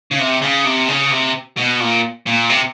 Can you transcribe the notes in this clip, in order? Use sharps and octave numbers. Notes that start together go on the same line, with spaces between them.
C#3
C3
C#3
C3
C#3
C3
B2
A#2
A#2
C3